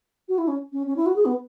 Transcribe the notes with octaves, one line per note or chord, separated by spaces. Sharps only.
F#4
E4
C#4
C#4
C#4
E4
F#4
G#4
B3